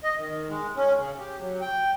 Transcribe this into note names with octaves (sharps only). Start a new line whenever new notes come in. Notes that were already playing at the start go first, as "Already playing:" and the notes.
D#5
D#3
G#3
C#4
C#3
G4
F#3
G5